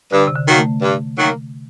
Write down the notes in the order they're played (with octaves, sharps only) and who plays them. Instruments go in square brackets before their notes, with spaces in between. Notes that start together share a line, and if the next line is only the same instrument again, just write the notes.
[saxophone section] G2 [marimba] D3
[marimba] C3
D3
[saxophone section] D#3 F#3 A#3 F#4
[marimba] A3
[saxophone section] G2
D#3 F#3 A#3 F#4